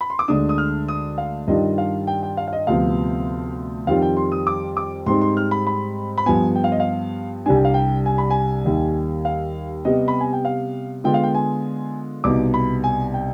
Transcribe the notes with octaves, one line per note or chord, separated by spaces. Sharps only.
B5
C6
D6
D2 D3 G#3 D4 D#6
D#6
F6
D#6
F5
G2 D#3 G3 D4 F4 D#5
F5
G5
G5
F5
F5
D#5
D2 C3 F3 B3 F5
F2 D#3 G3 C4 F4 F5
G5
C6
D#6
D6
D6
G#2 G3 C4 D#4 C6
C6
F6
B5
B5
B5
G2 F3 B3 G#5
G5
F5
D#5
F5
C2 C3 G3 D4 G#5
G5
F5
G5
G#5
B5
G#5
D#2 D#3 G3
F5
C3 G3 B3 D#5
B5
G#5
G5
F5
D3 G#3 B3 F4 G5
F5
G5
G#5
C2 B2 B3 D#4 D6
B5
G#5
G5